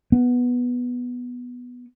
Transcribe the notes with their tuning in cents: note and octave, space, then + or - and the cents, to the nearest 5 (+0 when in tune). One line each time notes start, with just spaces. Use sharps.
B3 -5